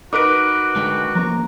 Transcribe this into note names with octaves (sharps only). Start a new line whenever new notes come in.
D#4 F#4 A#4 B4 D6 D7
D3 G#3 G5
F3 A#3 C#4 A#5